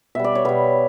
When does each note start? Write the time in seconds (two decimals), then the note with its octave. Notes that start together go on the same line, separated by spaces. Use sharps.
0.15 B2 G3 E5
0.24 D5
0.35 C#5
0.45 B2 G3 B4